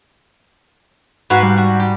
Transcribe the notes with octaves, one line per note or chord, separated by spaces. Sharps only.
G#2 F#4 B4 F5
G3
F#4
G4